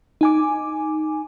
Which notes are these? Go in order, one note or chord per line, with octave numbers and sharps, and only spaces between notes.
D#4 G#5 D6